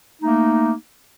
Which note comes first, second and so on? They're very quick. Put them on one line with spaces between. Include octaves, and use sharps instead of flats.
D#4 A3 A#3